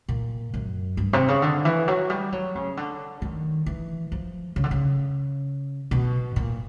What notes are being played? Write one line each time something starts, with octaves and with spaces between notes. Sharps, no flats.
A#2
F#2
G2
C3
C#3
D3
E3
F#3
G3
F#3
C#3
D3
D#3
E3
F3
C#3
D3
C#3
B2
A#2